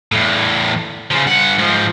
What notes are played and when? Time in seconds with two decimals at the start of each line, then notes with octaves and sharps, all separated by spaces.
0.12 E2 A2
1.11 C#3 F3
1.26 G2 F#5
1.58 G#2 F3